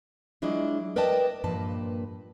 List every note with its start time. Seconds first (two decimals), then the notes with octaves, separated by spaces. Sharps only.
0.42 F#3 G#3 D4 E4 F4 D#5
0.96 A#4 B4 D5 D#5 G5 A5
1.44 G2 A#2 F3 A#3 B4 A5